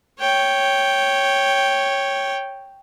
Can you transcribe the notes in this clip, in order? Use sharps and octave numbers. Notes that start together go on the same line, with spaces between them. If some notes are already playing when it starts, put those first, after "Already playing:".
C#5 G5